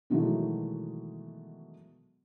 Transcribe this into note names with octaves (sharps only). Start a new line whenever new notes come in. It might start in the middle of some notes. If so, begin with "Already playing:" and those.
B2 D#3 E3 F#3 G#3 A3